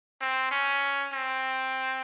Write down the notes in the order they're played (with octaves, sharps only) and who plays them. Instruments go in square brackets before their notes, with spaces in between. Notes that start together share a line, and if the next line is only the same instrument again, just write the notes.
[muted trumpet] C4
C#4
C4